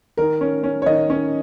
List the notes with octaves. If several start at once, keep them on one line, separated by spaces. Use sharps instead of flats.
D#3 A#4
C#4
C#4
C#5
D#3 D#5
C#4